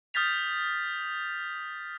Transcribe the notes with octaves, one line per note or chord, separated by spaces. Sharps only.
D#6 F6 G6 A6 B6 F7